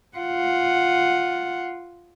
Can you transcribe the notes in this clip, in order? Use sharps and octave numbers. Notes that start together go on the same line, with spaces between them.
F4 F#5